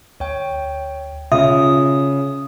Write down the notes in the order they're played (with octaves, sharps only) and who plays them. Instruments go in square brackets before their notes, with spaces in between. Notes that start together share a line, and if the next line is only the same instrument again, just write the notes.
[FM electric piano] D2 [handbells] C#5 G5
[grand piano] C#3 [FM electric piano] F4 [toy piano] E5 [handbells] D#6